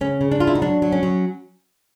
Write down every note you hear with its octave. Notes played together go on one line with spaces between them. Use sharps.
C#3 C#4
C#3
D4
C#3 F4
E4
D#4
F#3 D4
F#3
C#4
F#3